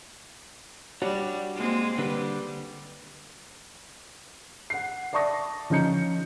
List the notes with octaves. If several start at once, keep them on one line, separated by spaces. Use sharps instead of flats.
G3 D4 F#4 C#5
G#3 A#3 C4
D3 G3 B4
F#5 C7
D5 E5 A5 C#6 D#6 A#6
F3 C#4 D#4 D#5 G6 C#7